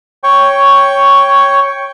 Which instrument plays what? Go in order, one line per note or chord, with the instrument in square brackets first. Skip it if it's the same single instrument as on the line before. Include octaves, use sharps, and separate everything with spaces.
[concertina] C#5 G5 C#6